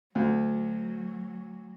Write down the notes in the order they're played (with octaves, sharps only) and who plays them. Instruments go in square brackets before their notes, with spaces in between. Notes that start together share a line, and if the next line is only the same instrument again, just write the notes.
[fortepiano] D2 [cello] F#3